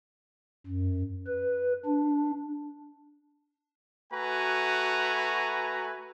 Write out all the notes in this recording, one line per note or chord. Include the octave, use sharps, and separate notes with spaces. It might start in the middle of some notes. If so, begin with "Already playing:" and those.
F#2
B4
D4
A3 F#4 B4 G#5 A#5